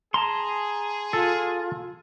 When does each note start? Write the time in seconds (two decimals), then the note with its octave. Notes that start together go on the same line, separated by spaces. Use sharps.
0.14 G#4 A5 A#5 C6
1.13 F4 A4